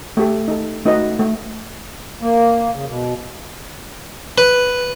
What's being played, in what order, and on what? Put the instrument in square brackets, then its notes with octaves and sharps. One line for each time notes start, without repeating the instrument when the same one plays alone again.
[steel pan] A3 G4 A4
D#4 A4
A3 D#4 F#4 B4 D#5
A3
[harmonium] A#3
C#3
B2
[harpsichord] B4